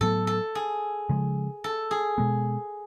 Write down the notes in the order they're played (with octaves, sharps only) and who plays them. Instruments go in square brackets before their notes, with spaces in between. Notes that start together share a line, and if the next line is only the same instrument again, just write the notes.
[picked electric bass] A2 F#3 B3 [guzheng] A4
[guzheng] A4
G#4
[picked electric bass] C#3 F3 G#3
[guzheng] A4
G#4
[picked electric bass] B2 G#3 B3